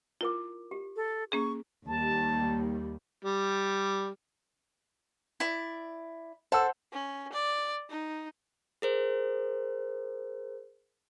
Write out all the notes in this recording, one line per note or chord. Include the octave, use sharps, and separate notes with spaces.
E4 F4 A#4 D6
G4
A4
A#3 C#4 G#4 C#6
D#2 G3 A5
G3
E4 D5
A4 C5 F#5 E6
C#4
D5
D#4
G#4 A#4 C5